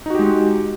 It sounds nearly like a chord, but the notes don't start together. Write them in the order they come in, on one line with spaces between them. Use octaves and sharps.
D#4 F#4 G4 G#3